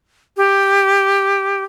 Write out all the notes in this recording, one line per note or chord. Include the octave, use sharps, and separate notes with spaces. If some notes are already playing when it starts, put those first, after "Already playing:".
G4